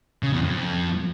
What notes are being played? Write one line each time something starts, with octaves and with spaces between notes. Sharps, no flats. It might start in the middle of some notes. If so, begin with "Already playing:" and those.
C#3
E2
F2